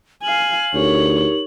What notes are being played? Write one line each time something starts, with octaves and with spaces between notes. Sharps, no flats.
F5 G#5 F#7
D2 D#4 G4 A#4 C#5